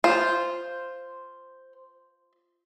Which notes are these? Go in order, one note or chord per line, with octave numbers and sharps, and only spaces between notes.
F4 C5